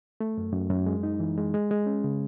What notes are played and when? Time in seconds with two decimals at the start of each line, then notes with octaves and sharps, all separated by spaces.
0.20 A3
0.38 F#2
0.53 F#2
0.70 F#2
0.86 G#3
1.03 D#4
1.20 E3
1.38 G#3
1.54 G#3
1.71 G#3
1.86 C#4
2.04 C#3